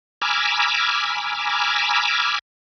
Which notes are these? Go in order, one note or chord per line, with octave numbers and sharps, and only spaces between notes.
G#5 A#5 B5 D6 E6 F6